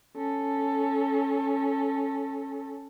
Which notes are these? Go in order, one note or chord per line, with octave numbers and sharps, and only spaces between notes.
C#4 A4